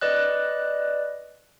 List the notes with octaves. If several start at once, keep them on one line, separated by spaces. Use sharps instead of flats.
B4 D5 D#5 F#6